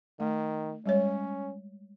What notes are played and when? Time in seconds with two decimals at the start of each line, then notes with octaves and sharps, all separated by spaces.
0.20 D#3 A3
0.86 G3 G#3 C#4 C#5